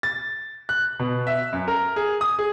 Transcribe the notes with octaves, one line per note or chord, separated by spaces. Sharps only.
A6
F#6
B2
E5
F#2
A#4
G#4
D#6
G#4